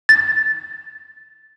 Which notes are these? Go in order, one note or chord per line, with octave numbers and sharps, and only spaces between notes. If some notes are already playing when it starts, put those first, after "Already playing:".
A6